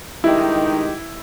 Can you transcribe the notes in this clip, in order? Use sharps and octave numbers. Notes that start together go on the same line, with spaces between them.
G2 D#3 G#3 D#4 E4 G4